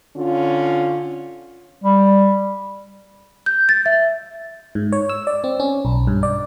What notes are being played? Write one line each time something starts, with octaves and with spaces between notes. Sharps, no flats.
D3 C#4 F4
G3
G6
A6
E5
G#2
C#5
E6
D5
C4
C#4
B1
G2
D5